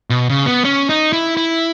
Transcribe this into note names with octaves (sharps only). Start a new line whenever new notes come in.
B2
C#3
B3
C#4
D#4
E4
E4